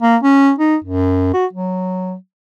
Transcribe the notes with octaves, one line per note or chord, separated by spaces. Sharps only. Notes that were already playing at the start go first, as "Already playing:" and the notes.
A#3
C#4
D#4
F#2
F#4
F#3